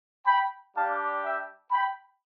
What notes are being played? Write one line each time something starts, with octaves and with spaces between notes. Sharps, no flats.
G5 B5
G3 D4 G4 F5 A5
E5 G5
G5 B5